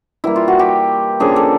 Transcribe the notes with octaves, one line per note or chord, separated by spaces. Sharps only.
E3 G3 A#3 E4
F4
F#4
G4
C#3 F3 A#3 D4 G#4
A4